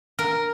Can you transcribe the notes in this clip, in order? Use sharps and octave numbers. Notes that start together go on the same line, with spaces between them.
A#4